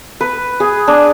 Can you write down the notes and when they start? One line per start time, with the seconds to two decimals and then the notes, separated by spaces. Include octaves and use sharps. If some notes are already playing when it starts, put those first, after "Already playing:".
0.21 B4
0.60 G#4
0.88 D4